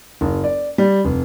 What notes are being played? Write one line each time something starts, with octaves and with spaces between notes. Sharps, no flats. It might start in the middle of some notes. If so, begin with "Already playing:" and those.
F#1
D5
G3
F1